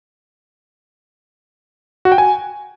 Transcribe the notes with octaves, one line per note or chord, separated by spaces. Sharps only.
F#4
G5
G#5